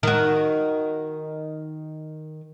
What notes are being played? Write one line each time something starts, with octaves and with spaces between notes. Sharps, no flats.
D#3 F#4